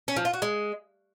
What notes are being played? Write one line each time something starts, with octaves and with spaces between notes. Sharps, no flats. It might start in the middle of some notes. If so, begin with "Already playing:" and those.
C#4
F3
F4
F#4
G#3